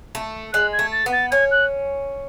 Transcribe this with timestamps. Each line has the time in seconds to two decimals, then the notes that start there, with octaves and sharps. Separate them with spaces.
0.15 A3
0.53 G#3 F#6
0.73 G#6
0.79 A3
0.92 A6
1.06 B3
1.12 A6
1.31 C#4 G#6
1.51 F#6